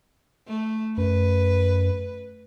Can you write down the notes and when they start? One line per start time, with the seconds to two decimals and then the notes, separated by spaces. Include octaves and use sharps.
0.47 A3
0.97 F#2 B4